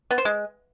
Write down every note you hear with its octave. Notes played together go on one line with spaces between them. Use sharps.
B3
C5
G#3